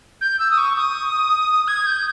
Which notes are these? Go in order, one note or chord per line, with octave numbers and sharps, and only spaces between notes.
G6
E6
D#6
C#6
D#6
G#6
G6